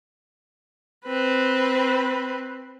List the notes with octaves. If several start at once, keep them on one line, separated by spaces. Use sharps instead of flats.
C4 B4